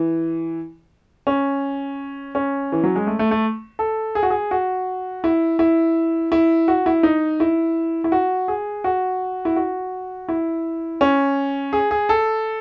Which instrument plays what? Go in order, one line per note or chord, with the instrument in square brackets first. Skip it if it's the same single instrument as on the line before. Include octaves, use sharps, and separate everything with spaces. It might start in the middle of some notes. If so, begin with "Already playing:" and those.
Already playing: [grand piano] E3
C#4
C#4
E3
F#3
G#3
A3
A3
A3
A4
G#4
F#4
G#4
F#4
E4
E4
E4
F#4
E4
D#4
E4
E4
F#4
G#4
F#4
E4
F#4
E4
C#4
G#4
G#4
A4